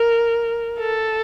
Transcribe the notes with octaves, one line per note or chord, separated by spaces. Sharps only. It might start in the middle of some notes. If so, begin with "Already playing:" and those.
Already playing: A#4
A4